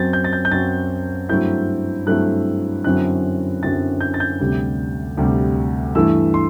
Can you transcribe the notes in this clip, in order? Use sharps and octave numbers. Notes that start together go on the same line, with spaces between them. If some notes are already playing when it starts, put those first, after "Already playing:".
Already playing: F#2 F#3 C4 G6 A6
G6
A6
G6
G6
F#2 F#3 C4 A6
G2 F#3 A3 C4 E4 G6
G2 F#3 A3 C4 E4 F#6
F#2 D3 F#3 C4 E4 F#6
F#2 D3 F#3 C4 E4 A6
G6
A6
G6
D2 C3 G3
D2 C3 G3
G2 E3 A3 E4 E6
C6